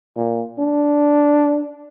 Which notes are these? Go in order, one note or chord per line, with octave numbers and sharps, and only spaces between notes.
A#2
D4